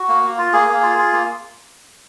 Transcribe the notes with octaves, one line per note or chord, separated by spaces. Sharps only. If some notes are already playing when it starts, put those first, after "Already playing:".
Already playing: F#4
A#3
A#3
F4
A#3 G#4
A#3
F4
F4
A#3